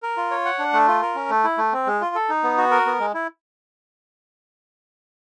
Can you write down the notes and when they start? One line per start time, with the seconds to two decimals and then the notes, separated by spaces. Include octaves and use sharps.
0.03 A#4
0.17 F4
0.31 C#5
0.45 F#5
0.59 D4
0.73 A3
0.88 F4
1.02 A#4
1.15 C#4
1.30 A3
1.44 E4
1.58 A3
1.73 C4
1.87 G#3
2.01 F4
2.15 A4
2.29 D#4
2.43 B3
2.58 F#4
2.71 A#4
2.86 B3
2.99 G#3
3.14 E4